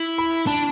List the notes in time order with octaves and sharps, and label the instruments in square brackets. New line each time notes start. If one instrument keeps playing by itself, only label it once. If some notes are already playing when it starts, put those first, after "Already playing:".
Already playing: [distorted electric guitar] E4
[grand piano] B5
[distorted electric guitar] D4 [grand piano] A5